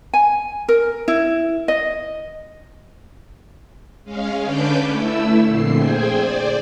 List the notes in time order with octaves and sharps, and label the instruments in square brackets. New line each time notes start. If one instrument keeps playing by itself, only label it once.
[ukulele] G#5
A#4
E4
D#5
[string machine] G#3 C#4 F5
D3 C#4 D4 B4 D6 G6
A3 E4 E6
F2 A#2 D3 C7
G#4 C5 G5 G#5
D5